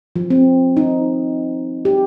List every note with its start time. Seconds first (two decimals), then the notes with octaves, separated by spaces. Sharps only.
0.16 F3
0.30 C4
0.77 D#4
1.85 G4